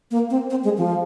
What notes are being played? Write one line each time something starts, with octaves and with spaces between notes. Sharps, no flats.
A#3
C4
C4
G#3
F3